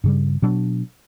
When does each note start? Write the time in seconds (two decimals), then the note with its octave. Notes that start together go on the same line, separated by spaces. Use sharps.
0.04 G2 C#3 G3
0.42 B2 F#3 D4